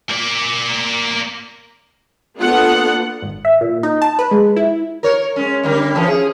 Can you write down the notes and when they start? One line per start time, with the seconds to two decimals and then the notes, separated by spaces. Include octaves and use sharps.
0.10 A#3 D5
2.38 A#3 B3 D4 F4 A4 F#5
3.22 G#1
3.45 E5
3.61 A#2
3.83 D#4
4.02 A5
4.19 B4
4.31 G#3
4.56 E4
5.03 A#4 C#5
5.36 G#3 C#4
5.63 D3 G3 A#3
5.95 E3 F3 C#4
6.08 G#4